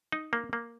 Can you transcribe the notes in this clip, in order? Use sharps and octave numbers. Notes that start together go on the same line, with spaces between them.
D#4
A#3
A#3